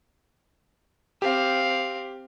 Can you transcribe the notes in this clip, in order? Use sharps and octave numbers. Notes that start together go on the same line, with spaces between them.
C4 G4 F5